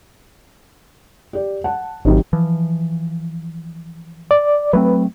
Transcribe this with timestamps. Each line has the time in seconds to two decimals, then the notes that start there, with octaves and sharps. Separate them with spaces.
1.33 G4 D5
1.64 F#5 A5
2.05 G#1 C3 D#3 F#3
2.33 E3 F3
4.31 D5
4.73 F#3 A3 C4 B4